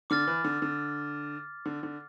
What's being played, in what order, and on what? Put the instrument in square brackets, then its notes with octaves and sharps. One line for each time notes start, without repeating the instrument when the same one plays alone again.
[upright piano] D3 [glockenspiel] D6 F6 A6
[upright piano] E3
D3
D3
D3
D3